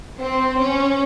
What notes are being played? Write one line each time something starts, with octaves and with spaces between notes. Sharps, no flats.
C4
C#4